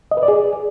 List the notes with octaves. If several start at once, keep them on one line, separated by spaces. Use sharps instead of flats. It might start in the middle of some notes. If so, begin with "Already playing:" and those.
D#5
B4
D5
G#4